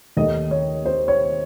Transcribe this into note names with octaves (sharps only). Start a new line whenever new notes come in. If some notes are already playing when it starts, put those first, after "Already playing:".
D#2 D#3 A3 D#5
C#5
C5
C#5